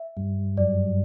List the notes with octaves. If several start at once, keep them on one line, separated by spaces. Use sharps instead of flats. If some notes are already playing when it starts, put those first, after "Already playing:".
Already playing: E5
G2
F#2 D5